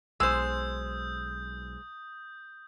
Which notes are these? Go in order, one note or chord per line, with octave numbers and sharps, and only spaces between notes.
B1 G#3 C5 D#6 E6 G6